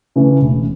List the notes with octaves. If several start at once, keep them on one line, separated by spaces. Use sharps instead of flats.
C#3 E3 A3
E1